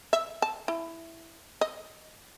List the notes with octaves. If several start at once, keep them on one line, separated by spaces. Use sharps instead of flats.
E5
A5
E4
D#5